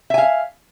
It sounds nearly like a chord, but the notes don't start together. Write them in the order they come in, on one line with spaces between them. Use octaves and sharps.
E5 G#5 F5